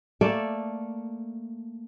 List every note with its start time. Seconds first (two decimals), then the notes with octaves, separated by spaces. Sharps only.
0.21 A3 A#3 A4 D5